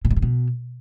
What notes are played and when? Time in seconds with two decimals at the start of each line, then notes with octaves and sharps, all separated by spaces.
0.05 A#2
0.11 A2
0.16 G#2
0.22 B2